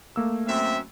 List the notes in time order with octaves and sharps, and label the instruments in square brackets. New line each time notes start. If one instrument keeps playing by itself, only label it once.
[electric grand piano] A3 A#3 E6
[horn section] F#2 C4 E5